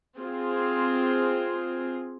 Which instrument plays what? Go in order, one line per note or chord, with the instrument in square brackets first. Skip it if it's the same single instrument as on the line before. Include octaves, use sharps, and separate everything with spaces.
[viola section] C4 F4 G#4